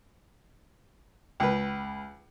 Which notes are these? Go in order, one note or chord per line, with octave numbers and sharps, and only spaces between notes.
C#2 B4